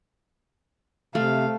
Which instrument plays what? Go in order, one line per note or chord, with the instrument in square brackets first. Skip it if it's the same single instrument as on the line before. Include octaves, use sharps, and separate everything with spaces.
[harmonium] C3 [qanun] A3 [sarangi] F5